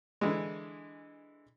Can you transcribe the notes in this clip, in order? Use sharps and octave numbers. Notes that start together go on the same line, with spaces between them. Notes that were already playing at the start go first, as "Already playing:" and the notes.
D3 E3 G#3